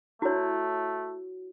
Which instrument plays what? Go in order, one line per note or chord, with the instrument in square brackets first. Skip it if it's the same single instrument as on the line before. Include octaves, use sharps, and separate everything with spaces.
[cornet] A3 [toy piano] E4 C#5 [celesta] F#4